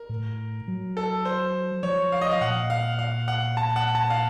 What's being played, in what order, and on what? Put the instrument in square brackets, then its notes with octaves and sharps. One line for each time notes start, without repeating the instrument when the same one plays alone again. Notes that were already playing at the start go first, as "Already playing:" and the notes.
Already playing: [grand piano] A#4
[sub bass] A2
F#3
[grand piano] A4
C5
[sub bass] F3 [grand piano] C#5
[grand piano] F5
D#5
F5
[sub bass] A#2 [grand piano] F#5
[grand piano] F5
F5
F#5
A5
F#5
A5
F5